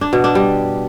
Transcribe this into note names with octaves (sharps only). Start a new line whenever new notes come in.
D4
B2
D4
G3